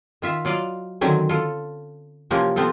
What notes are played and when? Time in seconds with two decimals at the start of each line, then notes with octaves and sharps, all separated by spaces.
0.22 D#3 F4 E5
0.45 F#3 F4 D5 D#5 F5
1.01 D3 D#3 F#3 C4 C#4
1.29 F4 A4
2.31 C3 E3 F3 A#3 C4 C#4
2.56 F3 B3 C4 F4 A4